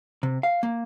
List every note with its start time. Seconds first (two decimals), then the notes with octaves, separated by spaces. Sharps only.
0.23 C3
0.43 F5
0.63 A#3